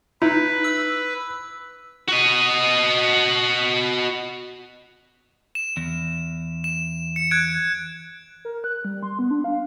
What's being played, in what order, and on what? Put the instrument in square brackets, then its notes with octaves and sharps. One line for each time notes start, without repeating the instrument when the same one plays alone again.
[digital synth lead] D#4 [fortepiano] E4 [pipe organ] B4
[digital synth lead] E6
[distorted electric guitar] F#4 D#5
[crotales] E7
[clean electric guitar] E2
[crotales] E7
C#7
F#6 G#6 D7
[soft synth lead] A#4
F#6
G3
C6
B3
D4
F5